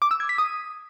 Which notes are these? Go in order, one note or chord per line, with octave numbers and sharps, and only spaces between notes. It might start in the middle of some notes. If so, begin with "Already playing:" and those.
D6
E6
G#6
B6
D#6